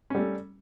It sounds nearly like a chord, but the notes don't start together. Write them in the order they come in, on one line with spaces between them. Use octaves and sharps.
C#4 G3 A3